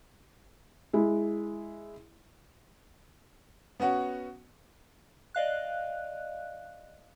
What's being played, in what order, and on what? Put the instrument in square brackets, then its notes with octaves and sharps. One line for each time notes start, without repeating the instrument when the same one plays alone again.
[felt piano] G#3 E4
[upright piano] B3 C#4 F#4 F#5
[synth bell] D5 D#5 F5 F#6